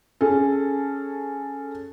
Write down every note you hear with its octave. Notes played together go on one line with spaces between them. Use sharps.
C#4 G#4 A4